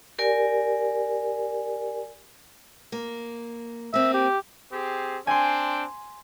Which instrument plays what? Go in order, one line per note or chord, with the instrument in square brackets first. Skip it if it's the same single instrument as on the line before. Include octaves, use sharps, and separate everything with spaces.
[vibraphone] G4 A#4 D5 G#5
[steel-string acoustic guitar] A#3
[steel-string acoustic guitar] A#3 C4 [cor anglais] E5
[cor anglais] G4
[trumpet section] C4 G4 G#4
[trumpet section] C4 D4 G5 [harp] G#5 C6